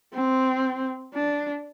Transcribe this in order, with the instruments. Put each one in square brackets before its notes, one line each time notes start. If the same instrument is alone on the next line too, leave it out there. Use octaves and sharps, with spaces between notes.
[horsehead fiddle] C4
D4